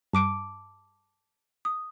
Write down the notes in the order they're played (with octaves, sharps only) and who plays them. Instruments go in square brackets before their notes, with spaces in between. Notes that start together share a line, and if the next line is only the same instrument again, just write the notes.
[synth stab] G2 [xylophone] A5 D6 D7
[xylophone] D#6